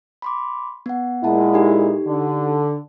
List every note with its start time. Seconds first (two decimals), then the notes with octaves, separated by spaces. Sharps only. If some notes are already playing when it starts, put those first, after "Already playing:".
0.22 B5 C6 D6
0.86 B3 F#5
1.24 A#2 G#3 E4 F#5 A5
1.54 D#4 G4 A4
2.07 D3